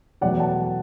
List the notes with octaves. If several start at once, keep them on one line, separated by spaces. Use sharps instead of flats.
E2 B2 F#3 A3 D5 F#5
F#5 A5